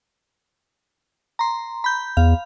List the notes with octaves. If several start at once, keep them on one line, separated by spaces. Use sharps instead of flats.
A#5 C6
B5 G6
E2 F5